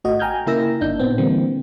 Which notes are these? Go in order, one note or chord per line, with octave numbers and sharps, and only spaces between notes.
G#1 A3 F#4 D#5
G5 G#5 A#5 F6 G6 G#6
C#3 A#3 E4 A#4 E6 A#6
G1 A#3 D4 D#4 G6
A#2 B3 C4
D3 E3 G3 A#3 C4